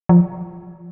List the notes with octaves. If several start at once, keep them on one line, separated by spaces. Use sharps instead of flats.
F3